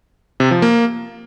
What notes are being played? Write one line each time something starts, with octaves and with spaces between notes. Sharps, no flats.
C3
F3
A#3